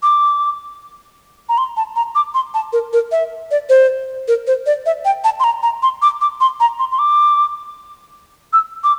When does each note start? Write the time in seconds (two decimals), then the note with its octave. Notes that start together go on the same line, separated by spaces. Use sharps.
0.03 D6
1.49 A#5
1.58 C6
1.77 A5
1.96 A#5
2.15 D6
2.34 C6
2.54 A5
2.73 A#4
2.93 A#4
3.12 E5
3.51 D5
3.69 C5
4.28 A#4
4.47 C5
4.66 D5
4.86 E5
5.05 G5
5.24 A5
5.40 C6
5.44 A#5
5.63 A#5
5.83 C6
6.02 D6
6.21 D6
6.41 C6
6.60 A#5
6.79 C6
6.91 C6
6.99 D6
8.53 E6
8.84 D6